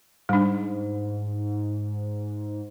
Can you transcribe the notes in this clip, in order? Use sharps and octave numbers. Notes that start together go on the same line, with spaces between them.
G#2 G3 D4